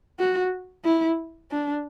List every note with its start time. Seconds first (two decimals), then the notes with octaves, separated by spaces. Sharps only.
0.19 F#4
0.85 E4
1.51 D4